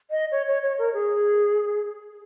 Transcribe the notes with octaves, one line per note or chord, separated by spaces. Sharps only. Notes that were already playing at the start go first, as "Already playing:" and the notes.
D#5
C#5
C#5
C#5
A#4
G#4